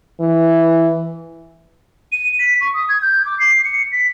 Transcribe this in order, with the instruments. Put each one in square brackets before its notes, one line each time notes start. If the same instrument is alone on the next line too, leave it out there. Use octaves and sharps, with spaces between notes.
[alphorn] E3
[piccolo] D#7
B6
C#6
D#6
G#6
G6
D6
C7
C#7
B6